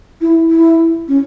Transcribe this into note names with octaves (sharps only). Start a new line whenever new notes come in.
E4
E4
C#4